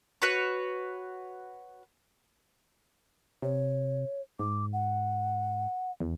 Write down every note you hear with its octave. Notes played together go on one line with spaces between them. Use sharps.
F#4 B4 C#5
C3 C#5
G#2 D6
F#5
E2